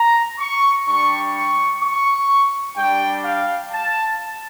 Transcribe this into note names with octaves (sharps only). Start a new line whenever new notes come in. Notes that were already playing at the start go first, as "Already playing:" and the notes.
Already playing: A#5
C#6
G3 D4 G4 C#6
C#6
C#6
G3 D4 G4 G5
F5
A5